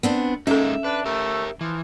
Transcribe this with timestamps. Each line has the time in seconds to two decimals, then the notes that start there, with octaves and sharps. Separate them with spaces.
0.03 B3 C4 D4
0.47 G#3 A#3 C#4 D#4 A4 E5
0.84 D4 B4
1.06 A3 G4 A#4
1.61 E3 F3